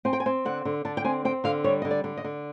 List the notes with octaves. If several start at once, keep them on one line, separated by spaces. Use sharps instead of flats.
C4 G#5
G5
G#5
C4
D3 F#5
D3
D3 A5
G5
C4 G#5
C4 G5
D3 F5
G3 C#5
D3 D#5
D5
D3
D#5
D3